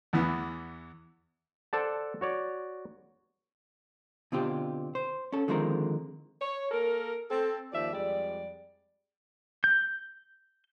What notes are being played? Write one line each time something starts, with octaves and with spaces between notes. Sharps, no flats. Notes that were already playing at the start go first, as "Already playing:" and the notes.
E2 E3 B3
A4 C5 D5 F#5 A5
F#4 C#5 D5
B2 D3 C4 F4 G4
C5
C#4 A4
D3 D#3 F3 G#3 C4 A#4
C#5
A#3 A4 A#4
C4 A4
D#2 F3 D5 E5
F2 G3 G#3 D5
G6